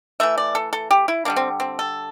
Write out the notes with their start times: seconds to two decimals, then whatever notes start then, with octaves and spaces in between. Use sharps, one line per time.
0.20 E3 A3 E5
0.38 D5
0.55 A4
0.73 A4
0.91 G4
1.08 E4
1.25 D3 G3 A#3 D4
1.36 C4
1.60 C4
1.79 A4